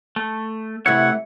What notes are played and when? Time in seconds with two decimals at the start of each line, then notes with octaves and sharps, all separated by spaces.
0.16 A3
0.86 C3 E3 A3 E4 C#5 F#5